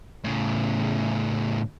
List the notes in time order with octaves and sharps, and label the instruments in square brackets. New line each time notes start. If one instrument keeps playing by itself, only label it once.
[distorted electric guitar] A2 C#3